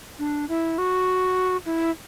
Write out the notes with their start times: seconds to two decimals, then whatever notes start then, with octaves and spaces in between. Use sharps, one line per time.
0.19 D4
0.49 E4
0.78 F#4
1.66 E4